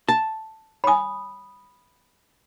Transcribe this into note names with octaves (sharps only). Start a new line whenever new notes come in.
A5
C#5 G#5 B5 D#6